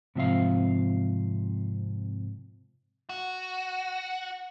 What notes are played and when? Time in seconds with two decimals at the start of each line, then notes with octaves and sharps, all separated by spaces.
0.15 G#2 C3 F3 C4 E5 F5
3.09 F#4